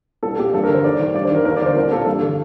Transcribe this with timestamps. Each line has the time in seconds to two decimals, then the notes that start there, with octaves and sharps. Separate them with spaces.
0.23 C2 A4
0.38 A#2 G4
0.54 G2 A4
0.64 A#4
0.68 D3
0.74 C5
0.84 D#2 D5
1.00 D#3
1.15 G2 D5
1.25 C5
1.31 D#3 A#4
1.45 D#2 A#4
1.56 D5
1.61 D3
1.66 C5
1.76 C2 A#4
1.92 A#2 A4
2.06 G2
2.22 D3